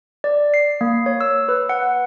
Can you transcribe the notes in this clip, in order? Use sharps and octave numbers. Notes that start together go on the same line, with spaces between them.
D5
C7
A#3
C#5
E6
B4
F#5